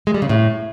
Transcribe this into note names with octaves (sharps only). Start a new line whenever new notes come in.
G#3
G3
C#3
A2